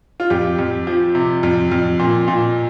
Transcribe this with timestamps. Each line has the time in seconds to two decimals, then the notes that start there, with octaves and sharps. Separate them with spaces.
0.20 F4
0.30 F2 G4
0.58 F2
0.87 F3
1.15 C3
1.43 F2
1.71 F2
1.99 A#2
2.28 A#2